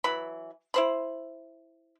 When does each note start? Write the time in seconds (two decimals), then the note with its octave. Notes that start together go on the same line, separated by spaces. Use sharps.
0.04 E3 F#3 B5
0.74 E4 C5 B5